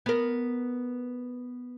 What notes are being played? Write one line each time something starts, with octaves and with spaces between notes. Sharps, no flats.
B3 A#4